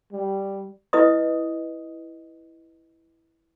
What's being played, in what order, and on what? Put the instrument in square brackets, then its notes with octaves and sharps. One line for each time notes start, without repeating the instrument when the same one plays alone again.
[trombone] G3
[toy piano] E4 B4 D#5 D#6